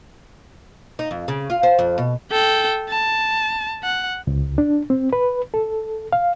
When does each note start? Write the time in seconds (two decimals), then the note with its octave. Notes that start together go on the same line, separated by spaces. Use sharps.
0.99 D#4
1.11 F2
1.28 C#3
1.50 F4
1.63 C5
1.79 F2
1.98 B2
2.32 A4 G5
2.89 A5
3.83 F#5
4.27 C#2
4.58 D4
4.90 C4
5.13 B4
5.54 A4
6.13 F5